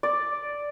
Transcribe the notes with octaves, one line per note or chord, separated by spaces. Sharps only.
D5